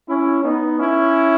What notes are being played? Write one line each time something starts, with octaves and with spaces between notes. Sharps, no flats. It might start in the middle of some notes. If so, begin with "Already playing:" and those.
C#4 E4
B3 D#4
C#4 E4